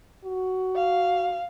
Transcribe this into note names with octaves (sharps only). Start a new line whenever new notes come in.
F#4
F5